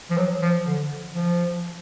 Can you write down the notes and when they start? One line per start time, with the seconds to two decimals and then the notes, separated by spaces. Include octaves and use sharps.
0.10 F3
0.17 F#3
0.41 F3
0.65 D3
1.15 F3